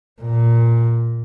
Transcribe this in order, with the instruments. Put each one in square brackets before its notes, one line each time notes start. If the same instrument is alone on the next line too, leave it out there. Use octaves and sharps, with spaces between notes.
[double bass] A#2